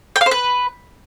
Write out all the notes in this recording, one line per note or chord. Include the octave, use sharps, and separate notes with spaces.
G5
F5
C5
B4